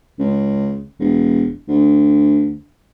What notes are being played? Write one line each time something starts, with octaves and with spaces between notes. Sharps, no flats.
C#2
E1
D2